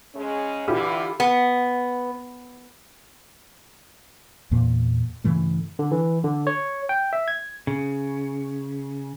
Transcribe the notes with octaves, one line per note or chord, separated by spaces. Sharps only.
C#3 G#3 C#4
D3 E3 E4 F4 G4
B3
E2 A#2 A#3
G2 C#3 E3 A3
D3
E3
D3
C#5
G5
E5
G#6
C#3